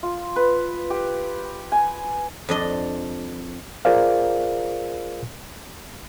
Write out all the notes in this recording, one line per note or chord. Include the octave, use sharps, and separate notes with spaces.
F4
B4
G4
G#5
F2 D4 D#5
F4 G#4 A#4 C5 D5 F5